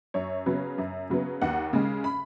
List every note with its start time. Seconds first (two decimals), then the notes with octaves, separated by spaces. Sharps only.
0.14 F#2 C#5
0.46 C#3 F#3 B3
0.78 F#2
1.10 C#3 F#3 B3
1.42 D#2 F#5
1.73 C#3 G#3
2.04 B5